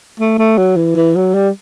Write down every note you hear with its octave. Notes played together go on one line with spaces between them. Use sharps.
A3
A3
F#3
E3
E3
F#3
G3